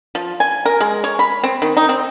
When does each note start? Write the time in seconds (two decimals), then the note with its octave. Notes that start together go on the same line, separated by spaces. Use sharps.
0.15 F3
0.40 G#5
0.65 A#4
0.81 G#3
1.04 C#5
1.19 B5
1.43 C4
1.62 D#3
1.77 D#4
1.89 C4